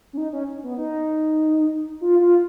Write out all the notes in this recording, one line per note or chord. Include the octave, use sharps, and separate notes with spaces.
C#4
D#4
C#4
B3
D#4
F4
F4